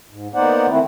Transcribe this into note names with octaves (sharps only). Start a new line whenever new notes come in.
G#2
A#3 B3 D#4 C5 D5 F#5
D#3 A3 C4 E4